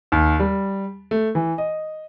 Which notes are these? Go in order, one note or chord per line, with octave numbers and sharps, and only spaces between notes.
D#2
G3
A3
E3
D#5